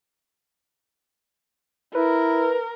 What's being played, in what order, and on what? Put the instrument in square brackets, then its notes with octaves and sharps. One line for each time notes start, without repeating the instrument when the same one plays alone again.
[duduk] E4 [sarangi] A#4 [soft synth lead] B4